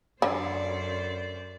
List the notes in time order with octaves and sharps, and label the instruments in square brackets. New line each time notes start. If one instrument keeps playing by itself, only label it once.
[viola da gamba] F#2 C5 D5 [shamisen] D3